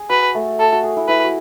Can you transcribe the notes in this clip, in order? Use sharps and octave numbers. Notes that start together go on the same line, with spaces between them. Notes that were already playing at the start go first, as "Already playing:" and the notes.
Already playing: G#4
F#4 B4
A3
A4
F#4
G#4
E4
E4 B4
F#4